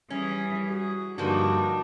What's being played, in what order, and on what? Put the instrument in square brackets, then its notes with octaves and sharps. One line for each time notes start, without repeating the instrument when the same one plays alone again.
[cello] E3 G#4 [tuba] G3 [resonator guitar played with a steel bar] C#4
[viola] F#4 [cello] G#4
[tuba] G2 [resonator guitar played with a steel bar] D3 F3 A#3 [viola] D4 [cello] D#4 F#4